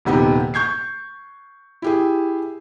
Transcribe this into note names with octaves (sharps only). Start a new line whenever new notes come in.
D#1 C3 B3 D#4 G4
C#6 G6 G#6 C7
E4 G4 G#4